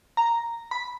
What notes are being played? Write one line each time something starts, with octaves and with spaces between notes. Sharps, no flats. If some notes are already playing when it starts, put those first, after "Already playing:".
A#5
B5